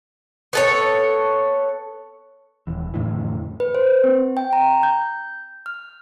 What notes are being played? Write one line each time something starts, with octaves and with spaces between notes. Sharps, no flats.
B3 A4 C#5
D#1 E3
F2 A2 D3 E3
B4
C5
C4
G5
A#5
G6
F6